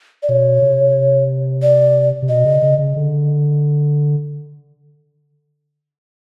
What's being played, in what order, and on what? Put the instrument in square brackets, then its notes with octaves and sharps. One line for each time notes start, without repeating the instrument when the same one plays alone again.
[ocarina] D5
[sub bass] B2 [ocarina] C#5
[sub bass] C3
[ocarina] D5
[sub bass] C3
[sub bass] B2 [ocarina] D#5
[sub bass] C#3
C#3
C#3
D3